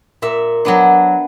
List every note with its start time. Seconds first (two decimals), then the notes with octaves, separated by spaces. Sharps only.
0.22 A#2 E5
0.65 F#3 B3 D4